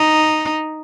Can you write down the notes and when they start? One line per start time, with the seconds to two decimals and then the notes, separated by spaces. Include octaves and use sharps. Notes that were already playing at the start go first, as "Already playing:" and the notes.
Already playing: D#4